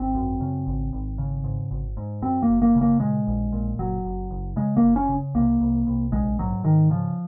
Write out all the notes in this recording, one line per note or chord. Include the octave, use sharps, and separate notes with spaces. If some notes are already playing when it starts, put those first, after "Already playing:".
Already playing: G#1 C4
F#2
C#3
G#1
G#1
C#3
G#2
G#1
G#2
F#2 C4
A#3
F#1
A#3
C#3
A#3
A#2 G#3
A#1
A#2
F#1 F#3
F#1
F#1
C#3 G#3
A#3
F#1
C#4
C#3
C2 A#3
C2
C2
A#1 G#3
G#2 F#3
G#2 D#3
C#3 F3